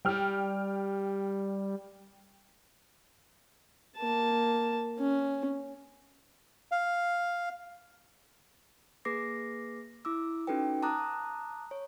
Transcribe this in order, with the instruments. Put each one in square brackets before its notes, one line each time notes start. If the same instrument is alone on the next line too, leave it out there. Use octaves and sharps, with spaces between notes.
[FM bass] G3 [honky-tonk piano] G5 F6
[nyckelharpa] A#3 A5
C#4
[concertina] F5
[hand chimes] A#3 G#4 B4 D6 A#6 C7
E4 D6 E6
C#4 D#4 F#4 A4 B4 G5
A5 A#5 D6 D#6 F#6
C#5